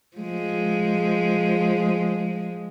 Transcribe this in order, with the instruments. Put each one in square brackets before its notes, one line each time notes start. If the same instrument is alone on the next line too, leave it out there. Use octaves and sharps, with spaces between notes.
[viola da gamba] F3 G#3